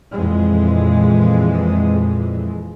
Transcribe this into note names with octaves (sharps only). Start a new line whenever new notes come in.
F2 A#2 E3 G#3